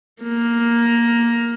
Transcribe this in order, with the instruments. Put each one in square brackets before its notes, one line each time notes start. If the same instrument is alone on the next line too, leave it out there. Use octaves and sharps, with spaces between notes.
[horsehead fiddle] A#3